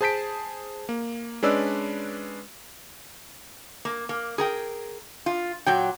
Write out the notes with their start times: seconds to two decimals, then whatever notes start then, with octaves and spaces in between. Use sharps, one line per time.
0.01 G#4 C5 A5 G6 B6 D7
0.89 A#3
1.43 G#3 C#4 D4 B4 D5 E6
3.85 A#3
4.09 A#3
4.38 G#4 A#4 G5
5.26 F4
5.66 A#2 F#3 G5